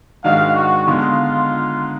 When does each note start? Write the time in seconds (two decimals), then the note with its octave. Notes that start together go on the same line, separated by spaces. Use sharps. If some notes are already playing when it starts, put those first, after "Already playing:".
0.24 G#2 D#3 G#3 D4 F#4 F5
0.55 F#4
0.87 D3 G#3 B3 D#4 F4